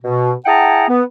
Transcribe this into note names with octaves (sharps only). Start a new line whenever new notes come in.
B2
E4 G#4 F#5 G5 A5 A#5
B3